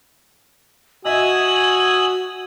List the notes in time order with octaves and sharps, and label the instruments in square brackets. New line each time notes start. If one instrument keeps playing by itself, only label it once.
[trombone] F#4 [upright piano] D#5 E5 [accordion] G#5 D#6 E6 [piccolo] F#7